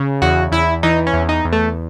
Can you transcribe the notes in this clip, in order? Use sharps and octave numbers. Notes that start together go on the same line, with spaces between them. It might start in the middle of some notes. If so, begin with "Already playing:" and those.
Already playing: C#3
E2 F#4
E2 E4
E3 D#4
C#4
E2
D#4
E2
A3